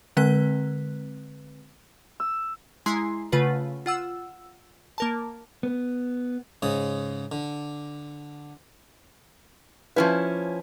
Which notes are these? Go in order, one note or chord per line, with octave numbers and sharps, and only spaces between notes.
D3 G#3 C4 B4 F#6 B6
E6
G#3 E4 G#5 A#5 C6 C7
C#3 A3 F4 B4 F#5
F4 F#5 E6
A#3 A#4 A5
B3
G#2 C#3 D#6
D3
F3 C#4 E4 B4 C#5 G#5